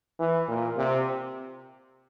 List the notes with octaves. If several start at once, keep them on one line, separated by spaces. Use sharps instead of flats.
E3
A#2
C3